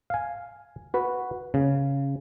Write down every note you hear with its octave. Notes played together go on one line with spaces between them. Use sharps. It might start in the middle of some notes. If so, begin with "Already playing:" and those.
F5 G#5
F#4 B4
C#3